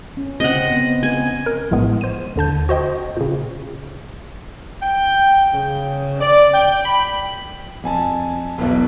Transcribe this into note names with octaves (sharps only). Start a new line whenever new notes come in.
C#4
C#3 C4 D#5 F#5
B3
G#5
A#4
A#1 A2 G#3 B3
C5 D#7
D#2 D3 A5 G6
F#4 C5 D#5 G5
A#2 C#3
G5
C#3
D5
G5
B5
F2 G#5 A5
E1 B1